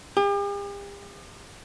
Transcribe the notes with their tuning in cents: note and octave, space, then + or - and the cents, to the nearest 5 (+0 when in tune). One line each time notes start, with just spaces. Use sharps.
G4 +45